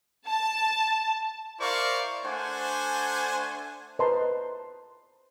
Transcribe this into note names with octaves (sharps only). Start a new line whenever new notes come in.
A5
E4 A#4 C5 D5 F5 C#6
A3 D4 C5 F#5 G#5
B4 C5 D#5 A5 A#5 C6